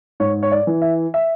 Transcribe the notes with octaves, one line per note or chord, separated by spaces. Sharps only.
G#2 C#5
C#5
D5
E3
E5
E5